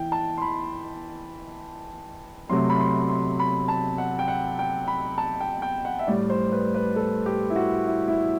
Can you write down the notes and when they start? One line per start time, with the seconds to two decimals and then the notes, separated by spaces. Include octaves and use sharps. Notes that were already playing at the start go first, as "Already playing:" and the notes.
Already playing: E3 G5
0.12 A5
0.38 C6
0.42 B5
2.49 C3 F#3 A3 C6
2.70 B5
2.80 C6
3.09 C6
3.39 B5
3.68 A5
3.98 F#5
4.19 G5
4.28 F#5
4.59 G5
4.88 B5
5.18 A5
5.40 G5
5.62 G5
5.85 F#5
5.99 E5
6.07 A2 G3 D5
6.30 C5
6.52 B4
6.75 B4
6.96 A4
7.26 G4
7.50 E4
7.56 F#4
7.87 E4
8.08 E4